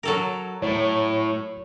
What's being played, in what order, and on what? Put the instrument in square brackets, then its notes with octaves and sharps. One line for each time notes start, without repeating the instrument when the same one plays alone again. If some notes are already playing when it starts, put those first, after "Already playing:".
[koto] F#3 A4 A#4
[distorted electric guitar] A2 [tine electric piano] C#5